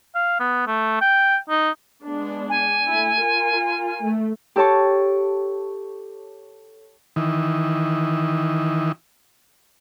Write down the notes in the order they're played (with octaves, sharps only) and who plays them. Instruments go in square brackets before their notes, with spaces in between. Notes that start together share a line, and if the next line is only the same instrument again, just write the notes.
[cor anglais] F5
B3
A3
G5
D#4
[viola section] G#3 B3 D4
[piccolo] G#5
[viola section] A3 E4
F4 A#4
A3
[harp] G4 A4 C#5 A5 C#6
[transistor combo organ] D#3 E3